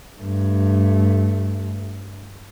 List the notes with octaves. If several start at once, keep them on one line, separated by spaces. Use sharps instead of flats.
G2 A3